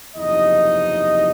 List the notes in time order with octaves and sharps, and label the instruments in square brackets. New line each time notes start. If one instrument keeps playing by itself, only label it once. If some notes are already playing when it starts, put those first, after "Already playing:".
[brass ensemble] F#1 E2 C3 F3 D#4 D#5